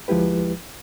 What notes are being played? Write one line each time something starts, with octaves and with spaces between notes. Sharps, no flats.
D2 F3 G#3 E4 G4 B4